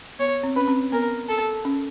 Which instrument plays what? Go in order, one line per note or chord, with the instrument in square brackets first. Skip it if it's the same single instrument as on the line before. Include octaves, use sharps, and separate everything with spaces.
[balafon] B3 [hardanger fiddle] C#5
[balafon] C4
[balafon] C#4 [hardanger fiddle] B4
[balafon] C4
[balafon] B3 [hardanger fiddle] A#4
[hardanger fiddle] A4
[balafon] C#4